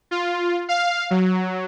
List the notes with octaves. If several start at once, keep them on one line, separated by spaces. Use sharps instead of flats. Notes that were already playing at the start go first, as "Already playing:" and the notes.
F4
F5
F#3